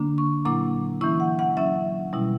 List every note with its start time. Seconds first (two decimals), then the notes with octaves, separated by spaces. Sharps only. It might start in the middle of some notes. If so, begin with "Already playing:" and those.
Already playing: D3 A#3 D4
0.18 C#6
0.45 A#2 F#3 A#3 E4 D6
1.01 E3 A#3 C#4 E4 C#6
1.20 F#5
1.39 F#5
1.57 F#3 C#4 E4 E5
2.13 B2 G3 C#4 E4